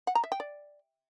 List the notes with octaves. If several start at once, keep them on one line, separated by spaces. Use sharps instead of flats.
F#5
A#5
E5
G5
D5